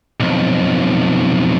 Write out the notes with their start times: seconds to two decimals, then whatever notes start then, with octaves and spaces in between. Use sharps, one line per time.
0.20 B1 F2